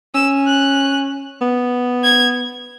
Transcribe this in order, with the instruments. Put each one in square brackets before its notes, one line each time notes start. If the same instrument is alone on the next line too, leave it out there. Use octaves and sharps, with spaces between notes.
[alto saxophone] C#4 [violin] E6
[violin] F#6
[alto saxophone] B3
[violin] G#6